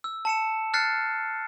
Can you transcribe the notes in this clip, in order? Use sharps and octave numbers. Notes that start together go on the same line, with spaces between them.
E6
A5 C#7 E7
F6 F#6 A6 C7 C#7